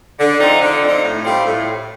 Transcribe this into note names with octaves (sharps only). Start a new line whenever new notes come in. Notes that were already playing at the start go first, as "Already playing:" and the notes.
D3
F3 C4 D#4
D3
F3 C4 D#4
A2
G3 C4 F4
A2